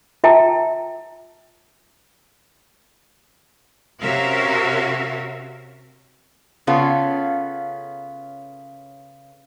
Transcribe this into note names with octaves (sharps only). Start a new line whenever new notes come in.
F4 E5 G5 A5 A#5
C3 C#4 F#4 A#4 E5 F5
C#3 B3 C#4 F4 A4